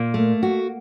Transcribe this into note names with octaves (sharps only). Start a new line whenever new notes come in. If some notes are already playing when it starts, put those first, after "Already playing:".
Already playing: A#2 A#3
A3
F#4